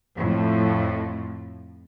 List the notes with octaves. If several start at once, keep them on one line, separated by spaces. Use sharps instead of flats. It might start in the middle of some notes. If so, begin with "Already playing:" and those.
F2 A2